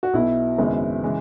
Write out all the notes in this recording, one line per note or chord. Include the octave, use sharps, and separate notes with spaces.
F#4
B1 B2 B3 E4
G#1 F#2 C#3 G#3 B3
C#3 E3 G#3